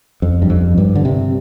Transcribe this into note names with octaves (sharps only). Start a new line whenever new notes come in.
F2
G2
F2
G2
D3
C3